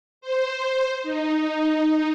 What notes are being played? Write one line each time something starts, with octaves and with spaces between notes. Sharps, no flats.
C5
D#4